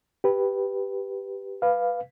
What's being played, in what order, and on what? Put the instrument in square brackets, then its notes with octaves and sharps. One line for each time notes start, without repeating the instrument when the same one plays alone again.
[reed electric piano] G4 B4
B4 F5